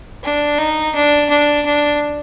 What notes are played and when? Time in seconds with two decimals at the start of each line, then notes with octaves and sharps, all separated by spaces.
0.24 D4
0.59 D#4
0.95 D4
1.30 D4
1.66 D4